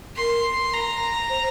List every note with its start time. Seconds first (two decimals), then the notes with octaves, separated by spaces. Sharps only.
0.17 A#4 C6
0.73 A#5
1.29 C5